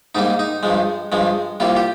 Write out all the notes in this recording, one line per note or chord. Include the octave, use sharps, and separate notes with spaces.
G#2 G3 A#3 D#4
D#4
G2 F3 G#3
G2 F3 G#3
C2 C3 G3 A#3 F4
G4